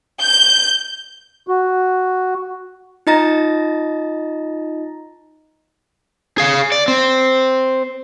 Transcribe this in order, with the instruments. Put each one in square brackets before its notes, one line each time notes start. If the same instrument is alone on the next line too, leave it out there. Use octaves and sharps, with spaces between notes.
[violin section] G6
[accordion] F#4
[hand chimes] D#4 F4 D#5 A#5 A6 A#6
[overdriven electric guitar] G#4 F5
D5
C4